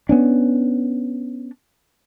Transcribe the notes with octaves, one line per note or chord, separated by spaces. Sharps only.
B3 C#4 D4